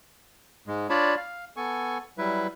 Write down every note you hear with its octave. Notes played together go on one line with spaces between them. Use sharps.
G#2 G#3
D4 F4 C#5 D5 A5 B5
F5
B3 A4 G#5 C#6
F#3 G3 E4 B4 E5